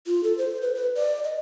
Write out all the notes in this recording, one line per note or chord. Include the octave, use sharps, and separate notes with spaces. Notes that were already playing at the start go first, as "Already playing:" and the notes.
F4
A4
C5
B4
B4
D5
D#5